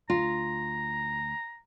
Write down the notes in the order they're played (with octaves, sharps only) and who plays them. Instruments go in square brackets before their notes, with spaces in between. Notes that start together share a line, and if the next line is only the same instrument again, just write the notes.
[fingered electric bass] D2 [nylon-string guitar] F4 [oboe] A#5